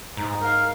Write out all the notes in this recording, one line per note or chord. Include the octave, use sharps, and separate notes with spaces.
G#2 D#4
A#4 F5